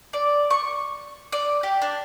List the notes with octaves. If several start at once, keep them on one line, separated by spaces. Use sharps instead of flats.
D5
C#6
D5
G4
D4